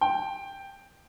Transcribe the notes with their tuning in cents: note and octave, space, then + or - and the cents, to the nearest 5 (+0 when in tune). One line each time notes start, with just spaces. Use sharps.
G5 +5